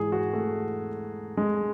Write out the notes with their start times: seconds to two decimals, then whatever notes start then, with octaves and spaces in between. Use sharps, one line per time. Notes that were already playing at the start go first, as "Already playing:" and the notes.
Already playing: G#2 E3 G#4
0.12 F#4
0.33 A3
1.37 G#3